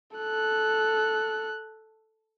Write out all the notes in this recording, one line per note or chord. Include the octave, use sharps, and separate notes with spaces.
A4 F#6